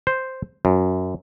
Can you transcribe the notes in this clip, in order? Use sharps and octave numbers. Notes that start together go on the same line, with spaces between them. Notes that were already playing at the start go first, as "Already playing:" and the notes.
C5
F#2